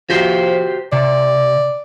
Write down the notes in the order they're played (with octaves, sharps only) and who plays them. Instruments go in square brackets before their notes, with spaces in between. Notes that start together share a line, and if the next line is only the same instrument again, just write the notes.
[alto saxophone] F3 [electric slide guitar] F#4 G4 C5
[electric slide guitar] C3 [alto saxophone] D5